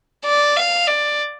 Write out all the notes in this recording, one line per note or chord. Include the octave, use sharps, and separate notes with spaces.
D5
F5
D5